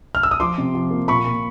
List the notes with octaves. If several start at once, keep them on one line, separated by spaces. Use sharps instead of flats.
F6
E6
D#6
F3 C6 D6
C3
F3
A#3
A#2 B5 C#6
A#2